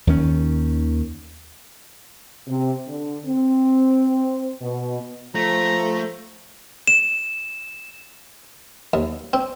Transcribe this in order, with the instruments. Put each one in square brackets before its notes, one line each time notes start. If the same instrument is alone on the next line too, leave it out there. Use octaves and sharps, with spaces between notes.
[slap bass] D#2 D#3 C#4
[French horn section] C3
D3
C4
B2
[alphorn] F3 [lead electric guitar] A3 [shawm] A#5
[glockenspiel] E7
[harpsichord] D#2
C4